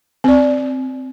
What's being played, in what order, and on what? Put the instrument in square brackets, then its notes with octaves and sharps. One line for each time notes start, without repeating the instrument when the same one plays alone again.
[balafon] C4 D5